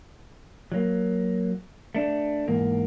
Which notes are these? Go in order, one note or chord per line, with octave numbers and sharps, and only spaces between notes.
F#3 A#3
A3 D4
E2 G#2 A#3